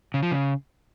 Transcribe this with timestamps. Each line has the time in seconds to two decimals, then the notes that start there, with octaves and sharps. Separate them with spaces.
0.14 C#3
0.23 F3
0.31 C#3